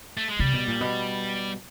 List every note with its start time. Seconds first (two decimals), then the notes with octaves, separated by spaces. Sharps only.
0.17 A3
0.28 G#3
0.39 C3 G3
0.54 B2
0.67 A#2
0.81 B2